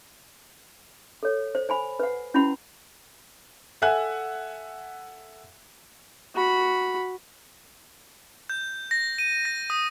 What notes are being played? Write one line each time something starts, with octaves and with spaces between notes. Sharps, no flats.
A4 C#5
C5
C5 G#5 B5
B4 F#5
C#4 E4 F#4 F#5 B5
A4 E5 F#5 G#5 F#6
F#4 B5
G6
A#6
D#7
A#6
D#6